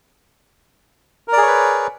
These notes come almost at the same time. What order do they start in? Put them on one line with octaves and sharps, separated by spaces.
A#4 D5 G#4 C#5 B4